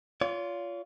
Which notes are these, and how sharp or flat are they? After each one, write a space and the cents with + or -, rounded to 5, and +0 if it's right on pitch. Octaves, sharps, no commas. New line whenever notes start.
F4 +0 C#5 +45